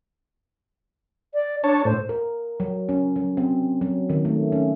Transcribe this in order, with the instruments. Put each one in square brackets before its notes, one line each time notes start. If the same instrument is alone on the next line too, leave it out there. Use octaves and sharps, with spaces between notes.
[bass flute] D5
[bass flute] D4 [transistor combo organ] C#5 A5
[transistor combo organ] A2 [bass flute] C5
[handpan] A#4
F#3
C#4
F#3
C4
F#3
D#3
A3
C#4